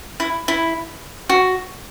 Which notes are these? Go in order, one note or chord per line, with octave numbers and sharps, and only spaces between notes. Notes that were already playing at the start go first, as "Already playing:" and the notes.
E4
E4
F#4